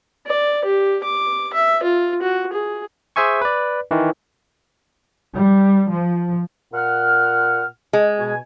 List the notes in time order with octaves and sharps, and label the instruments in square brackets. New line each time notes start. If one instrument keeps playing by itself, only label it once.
[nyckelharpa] D5
G4
D6
E5
F4
F#4
G#4
[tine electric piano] G#4 C5 E5 G#5 C#6
B4 D5
D#3 E3
[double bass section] G3
F3
[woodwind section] A#2 F#5 F6
[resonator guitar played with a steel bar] G#3
[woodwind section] B2 G#5